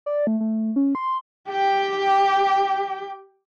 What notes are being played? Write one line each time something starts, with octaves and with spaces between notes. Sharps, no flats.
D5
A3
A3
C#4
C6
G4 G5